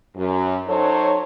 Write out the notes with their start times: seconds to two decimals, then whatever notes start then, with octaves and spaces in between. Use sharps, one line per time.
0.16 F#2
0.68 F#3 D#4 A4 C5 C#5